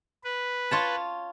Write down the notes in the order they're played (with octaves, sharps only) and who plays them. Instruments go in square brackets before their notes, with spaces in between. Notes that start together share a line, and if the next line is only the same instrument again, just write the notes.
[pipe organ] B4
[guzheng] F4 C#5 A5